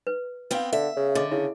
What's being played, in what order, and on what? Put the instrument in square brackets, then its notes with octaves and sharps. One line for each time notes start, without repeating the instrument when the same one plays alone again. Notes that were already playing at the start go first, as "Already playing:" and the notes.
[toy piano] B4
[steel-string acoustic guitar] B3 C4 G5 [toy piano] B4 F5
[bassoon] D3 [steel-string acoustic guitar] E5
[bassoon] C#3
[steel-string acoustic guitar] D3 [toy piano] D#5 D6
[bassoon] C#3 [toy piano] E4